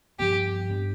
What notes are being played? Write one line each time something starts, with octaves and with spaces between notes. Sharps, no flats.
G2 F3 B3 D4 G4
G2 F3 B3 D4